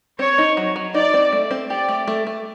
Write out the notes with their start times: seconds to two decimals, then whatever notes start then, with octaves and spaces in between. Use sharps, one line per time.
0.19 C4 C#5
0.38 D#4
0.57 F#3
0.76 F#3
0.94 D#4 D5
1.14 C4
1.32 A3
1.51 C4
1.70 G4 D5
1.89 A3
2.08 A3
2.27 A3